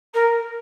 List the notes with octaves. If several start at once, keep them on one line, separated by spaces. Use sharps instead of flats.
A#4